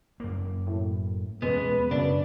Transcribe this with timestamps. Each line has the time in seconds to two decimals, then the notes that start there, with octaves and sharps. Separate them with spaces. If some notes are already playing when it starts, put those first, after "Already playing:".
0.20 F#2 A#3
0.67 A2
1.42 E2 B2 G#3 B3 C#4 B4
1.91 F#2 C#3 D4